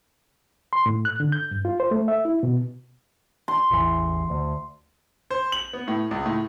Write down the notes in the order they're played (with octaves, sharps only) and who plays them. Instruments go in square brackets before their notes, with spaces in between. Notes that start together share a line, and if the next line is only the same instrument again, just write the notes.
[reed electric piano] C6
A2
F#6
D3
G6
G2
F4
C5
A3
E5
E4
B2
[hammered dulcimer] C6
[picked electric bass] A1 E2 E3
D2
[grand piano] C5
F#7
B3
A2
C#2
A2